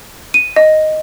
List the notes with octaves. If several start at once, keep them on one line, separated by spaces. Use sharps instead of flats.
D#7
D#5